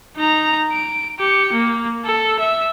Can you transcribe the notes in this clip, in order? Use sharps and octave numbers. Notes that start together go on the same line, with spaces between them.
D#4 A#5
D7
G4 C#7
A#3
A4
E5